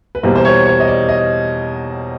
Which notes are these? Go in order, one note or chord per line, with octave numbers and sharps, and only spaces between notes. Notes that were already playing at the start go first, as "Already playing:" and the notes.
B4
E2 B2 G3 A#3 C5
C5
C#5
C#5
D#5
D5
D#5